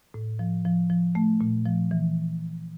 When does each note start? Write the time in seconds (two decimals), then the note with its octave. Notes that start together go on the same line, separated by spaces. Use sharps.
0.14 A2
0.39 F3
0.65 F3
0.90 F3
1.15 A3
1.41 A#2
1.65 F3
1.91 E3